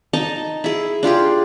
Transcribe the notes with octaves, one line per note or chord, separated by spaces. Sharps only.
D#4 D#5 A5 A#5
E4 G#4
D4 F4 G4 G#4